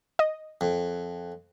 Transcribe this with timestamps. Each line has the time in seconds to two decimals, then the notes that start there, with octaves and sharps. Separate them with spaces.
0.19 D#5
0.61 F2